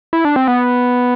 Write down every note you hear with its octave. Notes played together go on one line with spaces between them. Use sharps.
E4
D4
C4
B3